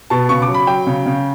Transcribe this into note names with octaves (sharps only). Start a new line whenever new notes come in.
B2 A5
C#3 C#6
D6
F#3
B5
F#3 G5
C#3
C#3